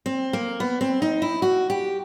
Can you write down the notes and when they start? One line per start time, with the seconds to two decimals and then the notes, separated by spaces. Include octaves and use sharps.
0.06 C4
0.33 A#3
0.60 B3
0.81 C4
1.02 D#4
1.22 E4
1.42 F#4
1.70 G4